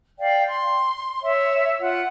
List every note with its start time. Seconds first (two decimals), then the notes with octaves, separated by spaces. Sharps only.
0.20 D5 F5 G5
0.48 C6
1.23 C#5 E5
1.80 F4 F#5